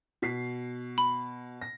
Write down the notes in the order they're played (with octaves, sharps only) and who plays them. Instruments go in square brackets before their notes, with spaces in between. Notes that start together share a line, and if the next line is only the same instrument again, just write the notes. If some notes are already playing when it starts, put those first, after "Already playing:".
[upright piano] B2 B6 C7
[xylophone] B5
[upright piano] A#6